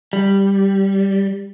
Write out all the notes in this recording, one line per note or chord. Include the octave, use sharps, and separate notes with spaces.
G3